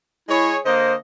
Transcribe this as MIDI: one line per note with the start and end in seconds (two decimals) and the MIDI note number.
0.29 0.59 56
0.29 0.53 64
0.29 0.59 68
0.29 0.59 73
0.66 0.95 50
0.66 0.95 58
0.66 0.94 72
0.66 0.95 75